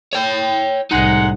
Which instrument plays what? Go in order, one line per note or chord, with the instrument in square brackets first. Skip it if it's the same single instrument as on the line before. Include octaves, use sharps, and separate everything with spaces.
[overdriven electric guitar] C#5 G5
[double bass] C2 A2 [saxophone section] G#3 F#5 [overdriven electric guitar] D#4